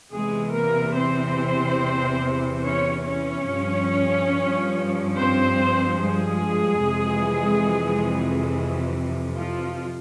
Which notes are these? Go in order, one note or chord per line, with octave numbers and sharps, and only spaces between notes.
E2 C3 E3 G#3 G#4
A#3 A#4
C4 C5
C#4 C#5
C#4 C#5
G2 F3
C4 C5
G#3 G#4
F2 C3 E3
F3 F4